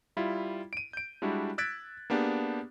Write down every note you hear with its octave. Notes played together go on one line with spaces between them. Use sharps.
G3 E4 F4
D7 D#7
G6 D7
G3 G#3 D4 E4 F#4
E6 F#6 G#6 A6 B6 D7
A#3 B3 D4 G4 G#4